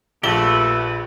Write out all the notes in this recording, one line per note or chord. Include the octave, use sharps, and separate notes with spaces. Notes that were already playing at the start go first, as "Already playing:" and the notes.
A#1 A3 F4 G4 A4 B4 G7